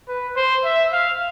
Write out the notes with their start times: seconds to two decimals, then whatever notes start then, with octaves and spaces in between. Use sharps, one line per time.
0.08 B4
0.36 C5
0.65 E5
0.93 F5